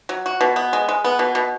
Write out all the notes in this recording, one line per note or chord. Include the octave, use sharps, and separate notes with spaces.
F#3
F#4
B2
B3
G#3
G#3
B3
B2
B2